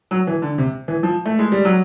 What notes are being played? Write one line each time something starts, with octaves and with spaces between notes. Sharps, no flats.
F#3
E3
D3
C3
E3
F3
A3
G#3
G3
F#3